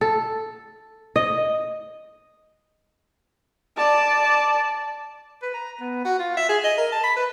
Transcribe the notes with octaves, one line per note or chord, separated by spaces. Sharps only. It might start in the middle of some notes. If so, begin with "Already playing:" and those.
A4
D#5
D5 A5
B4
A#5
B3
F#4
F4
E5
G#4
D#5
A#4
A5
B5
B4